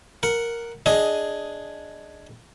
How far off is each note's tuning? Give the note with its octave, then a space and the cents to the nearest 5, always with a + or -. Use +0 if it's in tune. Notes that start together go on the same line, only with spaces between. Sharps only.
A#4 +0 F#5 +0
D4 +0 G#4 +0 D#5 +10